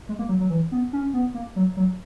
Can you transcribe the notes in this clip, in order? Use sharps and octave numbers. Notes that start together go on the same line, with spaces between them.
G#3
A#3
F#3
F#3
E3
B3
C#4
B3
A#3
F#3
F#3